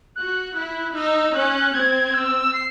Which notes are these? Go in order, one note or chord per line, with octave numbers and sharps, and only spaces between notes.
F#4 F#6
E4 F#6
D#4 E6
C#4 F#6
C4 G#6
E6
C7